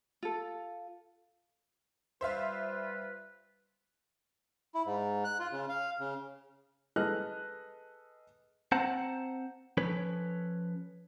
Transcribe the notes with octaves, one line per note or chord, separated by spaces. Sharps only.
F4 A4
G3 F4 B4 C5 E5 F5
E4
G#2
F#6
F4
C#3
F5
C#3
G#4 A4 B4 D#5 F6 F#6
C4 C5 F#5 A5 A#5
F3 C#4 A4 B4 C#5